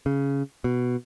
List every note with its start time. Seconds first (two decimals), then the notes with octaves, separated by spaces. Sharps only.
0.06 C#3
0.64 B2